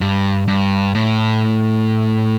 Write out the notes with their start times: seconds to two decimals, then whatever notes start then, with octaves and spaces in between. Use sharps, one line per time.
0.01 G2
0.48 G2
0.95 A2